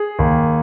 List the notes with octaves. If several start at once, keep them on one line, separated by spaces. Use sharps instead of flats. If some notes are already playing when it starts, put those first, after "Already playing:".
Already playing: G#4
D#2